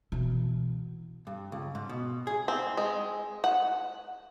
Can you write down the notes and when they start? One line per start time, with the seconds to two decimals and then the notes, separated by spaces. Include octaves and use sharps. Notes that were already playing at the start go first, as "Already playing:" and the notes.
0.12 B2 E3
1.27 G2
1.52 C#2
1.75 G#2
1.89 B2
2.27 G#4
2.48 C4
2.77 G#3
3.44 F#5